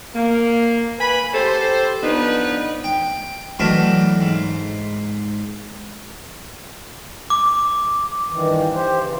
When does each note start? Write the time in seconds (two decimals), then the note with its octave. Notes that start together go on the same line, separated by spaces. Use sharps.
0.14 A#3
1.00 B4 G#5 B5
1.34 G4 A4 C5
2.02 F3 B3 D4 D#4 B4
2.84 G5
3.59 E3 F#3 A3 D4 A#4 D#5
4.21 G#2
7.30 D6
8.31 G2 D#3 E3
8.74 G4 C5
9.00 C#3 E3